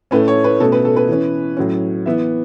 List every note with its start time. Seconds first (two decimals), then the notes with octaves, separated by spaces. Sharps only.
0.11 A2 A3 C#4 B4
0.28 C#5
0.44 B4
0.60 B2 A3 C#4 A4
0.72 B4
0.85 A4
0.97 B4
1.08 E3 C#4
1.57 A2 F#3 C#4
2.06 E3 B3 E5